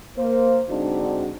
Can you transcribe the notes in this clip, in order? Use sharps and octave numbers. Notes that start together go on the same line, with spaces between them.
A#3 C5
G#2 D3 C4 D4 D#4 F#4